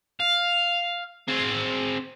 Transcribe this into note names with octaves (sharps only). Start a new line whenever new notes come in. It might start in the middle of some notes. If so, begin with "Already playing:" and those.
F5
C4 G#4